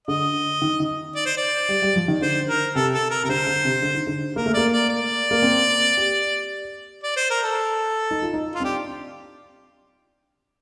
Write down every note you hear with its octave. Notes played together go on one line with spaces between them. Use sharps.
D3 D#5
D#3
D#3
D5
C5
D5
G3
G3
F3
D#3
D3 C5
A#4
C3 A4
A4
A#4
C3 A#4
D3 C5
D3
C3
D3
D#3
D3
A#3 A#4
A3
A#3 D5
D5
D5
A#3
C4
G4
D5
C5
A#4
A4
D#4
F4
D#4
F4
C4
D4 G4